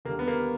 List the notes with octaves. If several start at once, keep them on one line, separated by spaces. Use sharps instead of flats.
D#2 D3 G3 A#3
B3
A#3